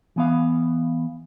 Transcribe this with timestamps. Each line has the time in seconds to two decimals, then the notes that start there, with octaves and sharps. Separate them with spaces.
0.16 E3 B3 F5